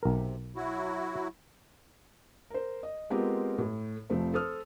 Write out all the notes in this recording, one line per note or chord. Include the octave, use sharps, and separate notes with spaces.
B1 C3 A#4
F#3 E4 F#4
A#4 C5
D#5
G#3 B3 C4 F4 G4 A#4
A2
F1 F3 A3 C4 C5
A4 C5 D#6 F6